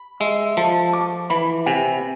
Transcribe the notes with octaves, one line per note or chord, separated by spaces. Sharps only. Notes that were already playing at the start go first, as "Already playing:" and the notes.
Already playing: B5
G#3 E5
F3 A4
D6
E3 B5
C3 G#5